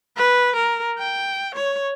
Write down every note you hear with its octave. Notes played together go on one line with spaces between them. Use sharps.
B4
A#4
G5
C#5